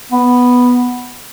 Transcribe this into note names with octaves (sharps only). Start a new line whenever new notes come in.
B3